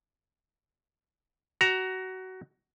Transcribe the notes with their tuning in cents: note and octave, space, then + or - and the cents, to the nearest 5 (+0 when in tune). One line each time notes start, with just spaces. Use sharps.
F#4 +20 A#5 +10